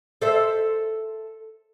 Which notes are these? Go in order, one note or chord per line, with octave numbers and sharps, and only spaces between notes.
A4 C5 E5